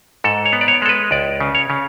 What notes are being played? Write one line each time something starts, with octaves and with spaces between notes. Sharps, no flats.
G#2 A4
C#5
B3
D5
C#5
G#3 A4
B4
C#2 D5
C#3
C#5
C#3